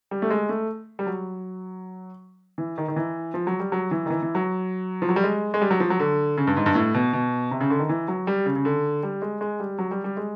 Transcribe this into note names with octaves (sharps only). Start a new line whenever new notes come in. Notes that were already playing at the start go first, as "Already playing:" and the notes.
G3
A3
G#3
A3
G3
F#3
E3
D#3
D#3
E3
F3
F#3
G3
F#3
E3
D#3
E3
E3
F#3
F3
F#3
G3
G#3
G#3
G3
F#3
F3
F#3
D3
C#3
G2
G#2
G2
A2
B2
B2
C3
C#3
D3
D#3
E3
F#3
G3
C#3
C#3
D3
G3
G#3
G#3
G3
F#3
G3
G3
G#3